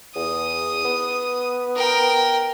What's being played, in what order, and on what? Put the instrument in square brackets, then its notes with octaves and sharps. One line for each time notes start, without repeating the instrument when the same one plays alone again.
[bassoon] E2 [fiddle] D#6
[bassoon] B3
[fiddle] A#4 G5